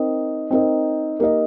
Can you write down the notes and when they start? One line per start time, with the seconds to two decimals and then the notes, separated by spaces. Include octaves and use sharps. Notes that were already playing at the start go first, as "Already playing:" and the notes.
Already playing: C4 D#4 A#4 D#5
0.51 C4 D#4 A#4 D#5
1.20 A#3 D#4 G4 A#4 D#5